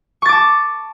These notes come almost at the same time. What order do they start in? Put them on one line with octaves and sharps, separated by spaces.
C#6 A6 D6 A5